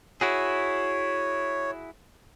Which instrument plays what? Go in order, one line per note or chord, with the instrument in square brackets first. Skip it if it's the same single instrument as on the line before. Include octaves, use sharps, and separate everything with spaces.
[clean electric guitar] E4 F#4 G#4 [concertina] C#5